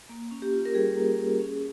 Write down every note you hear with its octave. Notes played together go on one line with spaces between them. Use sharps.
A#3
C#4
G4
F4
A#4
G3 G#4
A#3
C#4
C#4